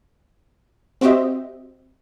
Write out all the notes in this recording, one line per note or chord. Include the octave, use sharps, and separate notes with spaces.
C4 F#4 G4 C5 D#5 E5